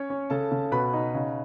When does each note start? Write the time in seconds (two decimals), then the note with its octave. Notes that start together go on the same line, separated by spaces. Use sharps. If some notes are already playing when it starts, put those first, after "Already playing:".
Already playing: C#4 C#5 C#6
0.10 C#4
0.30 C#3 A4 A5
0.52 C#3
0.72 B2 B4 B5
0.93 D#4
1.15 C#3